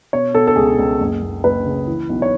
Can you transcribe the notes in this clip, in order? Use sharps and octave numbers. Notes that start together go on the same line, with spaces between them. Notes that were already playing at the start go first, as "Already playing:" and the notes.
B2 C#5
B2 A4
A4
C#2 G#4
C#2
F#1
F#1
F#1 B4
C#3
E3
B1
C#5